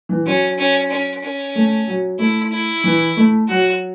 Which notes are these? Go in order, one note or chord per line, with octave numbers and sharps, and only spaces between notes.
E3
F#3 C#4
C#4
C#4
C#4
A3
F#3
A3 E4
E4
E3
A3
F#3 F#4